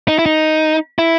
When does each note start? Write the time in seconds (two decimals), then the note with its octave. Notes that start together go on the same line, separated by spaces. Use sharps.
0.08 D#4
0.19 E4
0.26 D#4
0.99 E4